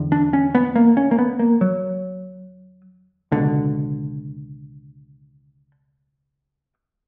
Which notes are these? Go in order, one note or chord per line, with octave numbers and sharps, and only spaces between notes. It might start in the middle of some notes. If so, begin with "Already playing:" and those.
Already playing: E2 D3
D4
C#4
B3
A#3
C#4
A#3
B3
A#3
F#3
C#2 B2 D3